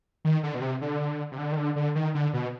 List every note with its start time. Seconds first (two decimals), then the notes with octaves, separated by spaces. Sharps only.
0.25 D#3
0.43 D3
0.55 B2
0.61 C3
0.81 D3
1.32 C3
1.38 D3
1.52 D#3
1.57 D3
1.76 D3
1.95 D#3
2.15 D3
2.33 B2